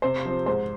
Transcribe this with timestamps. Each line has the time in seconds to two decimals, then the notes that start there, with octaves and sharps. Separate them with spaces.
0.02 C3 C5
0.25 F3 C4
0.46 G#2 C5